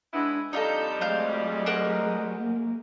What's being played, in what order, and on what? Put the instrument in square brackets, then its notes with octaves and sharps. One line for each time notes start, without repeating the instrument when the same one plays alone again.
[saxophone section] G#3 B3 E4 [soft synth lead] D4
[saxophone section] F2 G3 [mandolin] D#4 F4 A4 [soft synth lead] D#5 [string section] A#5 G6
[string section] F#3 G#3 A3 [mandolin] C5 F5 G6
[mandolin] A#4 C5 F#5
[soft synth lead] A#3